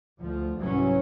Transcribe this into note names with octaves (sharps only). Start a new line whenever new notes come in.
D2 F3
C2 G#2 E3 F#3 C#4